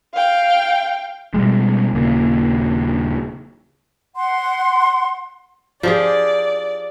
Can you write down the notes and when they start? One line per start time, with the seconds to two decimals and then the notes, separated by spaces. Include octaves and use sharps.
0.14 F5 G5
1.34 B2 G3 G#3
1.93 D#1 C#3 A#3
4.15 F#5 C6
5.83 F3 G4 G#4 D5